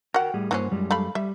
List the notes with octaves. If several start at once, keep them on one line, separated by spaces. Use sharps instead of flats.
F#4 A#4 F#5 G5
A2 G3 G#4
G2 E3 F#3 A#3 C#4 C5
F#2 G3 G#3
A3 F5 B5
G3 E5